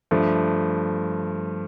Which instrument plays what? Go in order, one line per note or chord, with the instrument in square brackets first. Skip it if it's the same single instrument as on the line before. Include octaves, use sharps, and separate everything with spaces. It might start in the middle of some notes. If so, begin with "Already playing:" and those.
[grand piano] G2 F3 A3